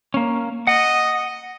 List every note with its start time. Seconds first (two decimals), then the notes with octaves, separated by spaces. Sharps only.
0.14 A#3 C#4
0.67 D#5 F#5